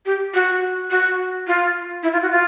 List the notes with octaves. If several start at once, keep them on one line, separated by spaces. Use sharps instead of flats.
G4
F#4
F#4
F4
E4
F4
F#4
F4